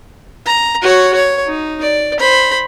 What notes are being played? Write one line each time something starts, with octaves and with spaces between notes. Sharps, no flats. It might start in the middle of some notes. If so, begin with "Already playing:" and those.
A#5
F#4 C#5
C#5
D#4
D5
C5 B5